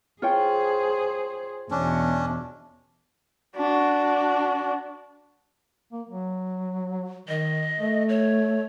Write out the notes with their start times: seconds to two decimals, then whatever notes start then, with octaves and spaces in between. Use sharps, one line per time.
0.22 F4 G#4 C5 C#5 G5
1.71 E2 B2 C#4 D4
3.56 D4 F#4
5.92 A#3
6.10 F#3
7.28 D#3 D#5
7.80 A3
8.09 C#5